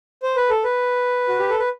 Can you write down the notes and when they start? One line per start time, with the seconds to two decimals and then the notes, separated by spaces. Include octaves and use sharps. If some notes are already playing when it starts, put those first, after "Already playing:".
0.23 C5
0.36 B4
0.50 A4
0.64 B4
1.29 F#4
1.39 G4
1.49 A4
1.59 B4